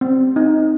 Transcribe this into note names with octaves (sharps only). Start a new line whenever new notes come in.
C4
D#4